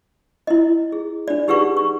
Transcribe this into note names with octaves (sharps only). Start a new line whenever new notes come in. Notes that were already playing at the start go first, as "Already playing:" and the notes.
E4 D#5
G#4
D4 D5
D#4 G4 G#4 B4 F#5 C#6
C#6